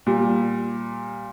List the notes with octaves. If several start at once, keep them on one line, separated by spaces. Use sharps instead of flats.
A#2 G3